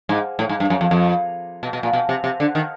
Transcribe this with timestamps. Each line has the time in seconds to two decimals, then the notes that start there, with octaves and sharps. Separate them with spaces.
0.09 G#2
0.39 A2
0.49 G#2
0.60 G2
0.70 F#2
0.81 F2
0.91 F2
1.63 B2
1.73 B2
1.83 A#2
1.93 B2
2.09 C3
2.24 C3
2.40 D3
2.55 D#3